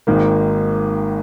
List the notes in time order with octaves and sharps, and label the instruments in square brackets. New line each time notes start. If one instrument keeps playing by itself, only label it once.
[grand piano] G#1 G#2 D#3 A#3